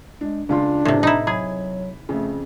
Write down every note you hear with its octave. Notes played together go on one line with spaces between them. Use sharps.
G#3 D4
C#2 D4 F4 C6
C#2 A2 C3
D#4 E4 A#5 B5
F#3 G#4 B5 G#6
F2 C#3 A3